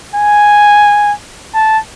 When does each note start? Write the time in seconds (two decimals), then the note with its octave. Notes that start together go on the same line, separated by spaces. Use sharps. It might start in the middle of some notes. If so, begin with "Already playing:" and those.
0.16 G#5
1.55 A5